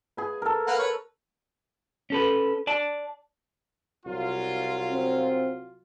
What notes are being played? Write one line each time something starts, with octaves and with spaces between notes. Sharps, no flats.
G#4 B4
A4 A#4
A#3 B4 F#5
B4 C#5
C#4 A4 B4
D5 A5
C2 F#3 F4
C4